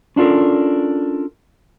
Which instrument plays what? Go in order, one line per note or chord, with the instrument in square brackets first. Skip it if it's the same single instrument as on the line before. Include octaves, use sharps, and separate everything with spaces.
[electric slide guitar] C#4 D4 F4 A4 A#4